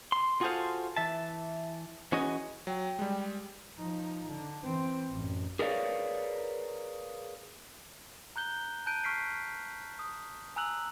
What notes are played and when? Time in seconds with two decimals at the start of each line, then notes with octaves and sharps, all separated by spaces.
0.12 C6
0.41 F4 F#4 G#4 A4 C5 F5
0.96 E3 E5 A5
2.12 E3 C#4 F#4 G#4 D#5
2.67 F#3 G5
2.99 G3 G#3
3.77 F3 D#4
4.28 D3
4.63 E3 C4
5.09 A1 F#2
5.59 G#4 A#4 B4 C#5 D5 F5
8.36 A#5 F#6 G6 G7
8.86 A5 F#6 G6 D7 D#7
9.04 C#6 F6 B6 C7 D7
9.99 D#6
10.56 G#5 A#5 E6 F#6 F7 F#7